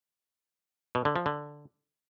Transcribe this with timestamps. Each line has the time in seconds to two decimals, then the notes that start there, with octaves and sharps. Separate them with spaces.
0.95 B2
1.05 D3
1.16 F3
1.26 D3